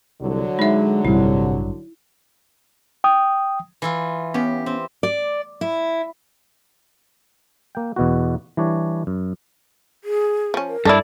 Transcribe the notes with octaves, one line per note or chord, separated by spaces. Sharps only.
C2 D3 F#3
G#3 D#4 E5
A1 G2 C3 E4
G5 D#6
E3 E4 F4
B3 C#4 G4
C4
D5
E4
A#3 G5
E2 B2 B3 F#4
E3 G3 D4 C#5
F#2
G#4
F3 C#4
A#4
G2 D4 E4 A4 D5